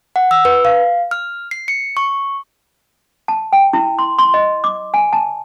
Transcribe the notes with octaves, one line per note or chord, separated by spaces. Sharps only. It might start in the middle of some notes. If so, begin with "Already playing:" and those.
F#5
E6
B4
F5
F6
C7
C#7
C#6
A5
G5
E4
C6
C6
D#5
D6
G#5
A5